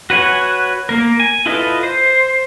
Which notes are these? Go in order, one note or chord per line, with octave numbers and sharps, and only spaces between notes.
F#4 B4 C#5 F#5 G#5
A#3 A#4
G#5
E4 F4 A4 B4 D#5
C5